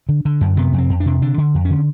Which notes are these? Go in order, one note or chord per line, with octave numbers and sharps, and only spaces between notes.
D3
D3
F#2
C3 B3
F2
C4
F2
D4
C3
D3 D4
D3
F2
C#4
D3